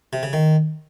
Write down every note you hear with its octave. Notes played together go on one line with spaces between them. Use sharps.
C3
C#3
D#3